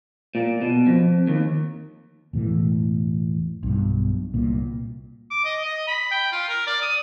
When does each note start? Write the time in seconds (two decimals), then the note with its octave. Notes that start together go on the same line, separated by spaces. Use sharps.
0.35 A#2
0.62 B2
0.87 F2
1.27 D#2
2.33 E1 A2 E3
3.63 B1 G2
4.34 C2 A#2
5.31 D6
5.45 D#5
5.65 D#5
5.87 B5
6.11 G5
6.32 F4
6.48 A#4
6.67 D5
6.82 D#6